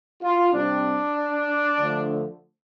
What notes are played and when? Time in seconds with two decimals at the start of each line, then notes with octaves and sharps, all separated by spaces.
0.21 F4
0.52 C3 G3 C4 D4
1.78 D3 F3 A3